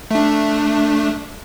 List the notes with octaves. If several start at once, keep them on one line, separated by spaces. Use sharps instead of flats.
A3 D4